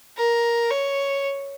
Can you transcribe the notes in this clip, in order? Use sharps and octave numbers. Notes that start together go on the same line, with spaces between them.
A#4
C#5